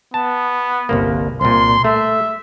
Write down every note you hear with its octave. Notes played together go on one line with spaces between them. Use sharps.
B3 A5
G1 C2 A#3
C2 A#2 C6
A3 E5